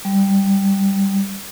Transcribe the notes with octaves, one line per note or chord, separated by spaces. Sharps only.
G3